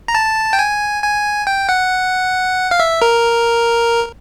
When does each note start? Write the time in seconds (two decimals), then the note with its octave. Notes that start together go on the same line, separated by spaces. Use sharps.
0.08 A#5
0.15 A5
0.53 G5
0.59 G#5
1.03 G#5
1.47 G5
1.69 F#5
2.71 F5
2.80 E5
3.02 A#4